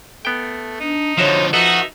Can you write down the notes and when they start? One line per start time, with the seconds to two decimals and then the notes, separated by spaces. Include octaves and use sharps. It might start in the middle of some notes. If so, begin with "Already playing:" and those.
0.25 A3 B3 G5
0.80 D4 D#4
1.18 D3 F3 F#4 C#5 E5 F5
1.53 F3 D#4 F#4 A4 B4 D#5 E5 F#5